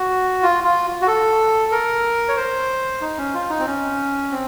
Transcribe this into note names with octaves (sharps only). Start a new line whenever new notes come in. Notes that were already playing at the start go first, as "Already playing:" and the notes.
Already playing: F#4
F4
F4
F#4
A4
A#4
C#5
C5
D#4
C#4
F4
D#4
C4
C#4
C4